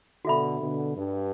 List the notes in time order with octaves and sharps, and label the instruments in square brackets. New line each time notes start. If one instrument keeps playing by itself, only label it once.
[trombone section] B2 D3 [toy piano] F#4 A4 E5 B5
[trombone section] B2 D3
G2